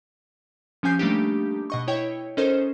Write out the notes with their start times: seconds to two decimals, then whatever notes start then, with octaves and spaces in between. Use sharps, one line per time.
0.83 F3 C#4 G4 G#5 G6 C7
0.99 G3 A3 A#3 D4 D#4 G4
1.70 B2 D#5 C#6
1.88 E4 C#5 D#5 G5
2.37 C#4 D#4 A4 A#4 C5 D#5